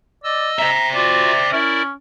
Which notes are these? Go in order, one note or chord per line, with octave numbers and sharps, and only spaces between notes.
D5 D#5 E6
C5 E5 A#5
F4 F#4 D5
C#4 E4 A#4 D5